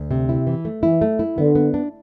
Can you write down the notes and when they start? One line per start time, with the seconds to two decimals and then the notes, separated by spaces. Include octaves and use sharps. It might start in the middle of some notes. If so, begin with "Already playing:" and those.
Already playing: D2
0.11 C3
0.29 E4
0.47 E3
0.65 A3
0.83 E3 E4
1.02 A3
1.19 E4
1.38 D3 B3
1.55 B3
1.74 D4